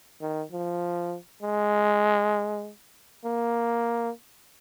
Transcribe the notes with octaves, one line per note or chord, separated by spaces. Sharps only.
D#3
F3
G#3
A#3